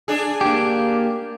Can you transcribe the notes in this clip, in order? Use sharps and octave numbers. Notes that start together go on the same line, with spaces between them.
D4 G#4
A#3 G4